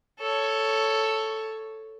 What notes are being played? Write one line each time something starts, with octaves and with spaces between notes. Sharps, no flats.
A4 C#5